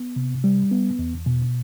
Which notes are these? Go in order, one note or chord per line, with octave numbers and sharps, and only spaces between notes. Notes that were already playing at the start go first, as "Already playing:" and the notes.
Already playing: B3
C3
G3
B3
E2
B2